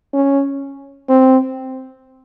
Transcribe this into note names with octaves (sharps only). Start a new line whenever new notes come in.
C#4
C4